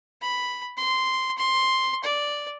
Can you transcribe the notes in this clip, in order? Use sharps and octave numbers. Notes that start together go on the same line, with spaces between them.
B5
C6
C6
D5